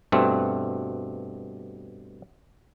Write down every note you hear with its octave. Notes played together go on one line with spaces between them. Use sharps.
G2 B2 A3 C4